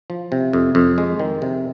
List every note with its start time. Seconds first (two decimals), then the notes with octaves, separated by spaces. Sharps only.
0.10 F3
0.32 C3
0.53 F2
0.75 F2
0.98 G#3
1.19 D#3
1.42 C3